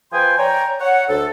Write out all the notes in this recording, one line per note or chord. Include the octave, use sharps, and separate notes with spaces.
F3 B4 G5 G#5 C6
C#5 D5 G5 G#5 A#5
C#5 F#5
D2 A4